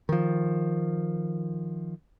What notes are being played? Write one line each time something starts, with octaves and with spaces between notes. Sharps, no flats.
D#3 F3